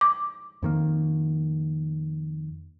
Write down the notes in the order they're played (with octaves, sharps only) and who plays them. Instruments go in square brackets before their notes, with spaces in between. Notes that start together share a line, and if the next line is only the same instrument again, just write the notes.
[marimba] D6
[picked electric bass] F2 D#3 A#3